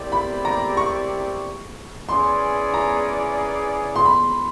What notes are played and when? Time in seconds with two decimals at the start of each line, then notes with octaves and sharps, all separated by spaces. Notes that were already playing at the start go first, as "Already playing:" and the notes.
Already playing: C4 E4 G4 A#4 D5
0.12 B5
0.45 A#5
0.77 C#6
2.08 C#4 E4 G#4 B4 D5 C6
2.74 A#5
3.96 C6
4.05 B5